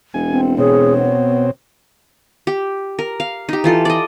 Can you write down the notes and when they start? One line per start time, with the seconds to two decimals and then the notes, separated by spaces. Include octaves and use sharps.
0.14 E1 G#5
0.30 C4
0.58 B2 C4 G#4 C#5
0.98 B3
2.47 G4
2.99 A#4
3.20 F5
3.49 D#4 G4
3.64 E3 F4 A4
3.85 D5 D#5